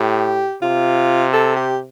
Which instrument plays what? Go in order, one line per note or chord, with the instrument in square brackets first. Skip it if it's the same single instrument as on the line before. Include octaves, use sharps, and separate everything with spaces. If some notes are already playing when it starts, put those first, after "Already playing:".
Already playing: [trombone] A2 [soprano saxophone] G4
[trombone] C3 [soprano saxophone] F4
[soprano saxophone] A4
G4